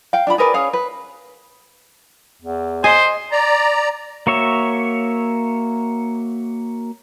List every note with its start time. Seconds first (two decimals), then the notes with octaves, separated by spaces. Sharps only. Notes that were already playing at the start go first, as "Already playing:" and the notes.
0.13 F5 G5
0.27 D4 F4 B5
0.38 G#4 A#4 B4 D5
0.54 C#4 G#4 C#5 F5
0.73 B4
2.42 E2
2.84 C5 D#5 G#5
3.32 D5 A#5
4.27 A#3 F#4 C#5 E5